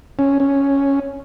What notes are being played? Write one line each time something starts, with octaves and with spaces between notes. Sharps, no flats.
C#4
C#4